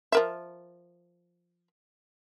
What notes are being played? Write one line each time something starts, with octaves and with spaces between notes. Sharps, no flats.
F3 A#4 E5